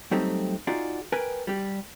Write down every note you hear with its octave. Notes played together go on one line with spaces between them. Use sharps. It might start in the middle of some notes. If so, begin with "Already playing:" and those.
F#3 G3 A3 C4 D#4 G4
D#4 F4 F#4 G#4 D5
A#4 B4 G5 G#5
G3 G4